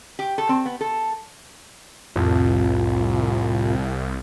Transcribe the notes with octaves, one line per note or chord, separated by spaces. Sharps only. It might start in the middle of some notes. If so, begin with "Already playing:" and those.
G4
A4
C4
B3
A4
C2 F2 A2 F4